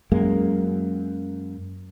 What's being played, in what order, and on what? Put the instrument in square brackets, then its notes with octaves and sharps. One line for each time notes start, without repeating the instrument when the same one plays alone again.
[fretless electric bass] F#2 G#3 A#3